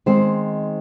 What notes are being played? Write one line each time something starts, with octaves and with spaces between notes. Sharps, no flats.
D#3 G#3 C4 C5